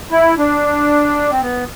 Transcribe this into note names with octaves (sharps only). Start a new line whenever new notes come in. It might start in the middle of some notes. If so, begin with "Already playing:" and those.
E4
D4
C4
B3